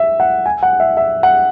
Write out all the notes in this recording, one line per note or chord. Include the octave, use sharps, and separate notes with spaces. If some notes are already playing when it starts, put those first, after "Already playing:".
Already playing: E5
F#5
G#5
F#5
E5
E5
F#5